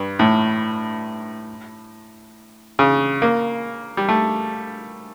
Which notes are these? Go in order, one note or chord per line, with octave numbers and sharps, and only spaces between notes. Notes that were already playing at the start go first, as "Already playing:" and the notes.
Already playing: G2
A2
C#3
A#3
G3
A3